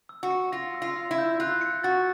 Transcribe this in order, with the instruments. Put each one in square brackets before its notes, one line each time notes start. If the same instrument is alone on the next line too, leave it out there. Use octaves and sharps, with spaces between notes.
[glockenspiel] E6
[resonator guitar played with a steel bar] F#4
[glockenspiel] C#7
[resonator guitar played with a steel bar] F4 [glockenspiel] A#6
[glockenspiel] E6
[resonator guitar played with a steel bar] F4
[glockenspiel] E6
[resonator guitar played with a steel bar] E4
[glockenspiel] G6
[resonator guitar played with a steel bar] F4 [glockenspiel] F#6
[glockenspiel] C#7
[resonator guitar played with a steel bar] F#4 [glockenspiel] A6